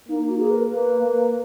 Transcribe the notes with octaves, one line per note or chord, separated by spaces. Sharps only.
A#3 D#4
D#4
F#4
G#4
B4
A#4
A#3 B4
A#3